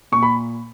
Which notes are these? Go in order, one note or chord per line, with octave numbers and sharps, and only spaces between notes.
A#2 C#6
B5